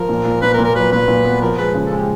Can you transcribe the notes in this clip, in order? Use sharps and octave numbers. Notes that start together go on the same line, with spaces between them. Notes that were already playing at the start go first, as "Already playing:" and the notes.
Already playing: F3 A#4
A#2
A#2
A#2 B4
A#4
A#2
A#4
F#3 B4
A#2 B4
A#2
B3
F3 A#4
G#3 B4
C#3
A4
G#3 G4